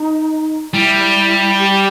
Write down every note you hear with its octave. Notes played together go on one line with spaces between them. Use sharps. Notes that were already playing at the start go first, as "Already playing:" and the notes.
Already playing: D#4
G3 E4
G4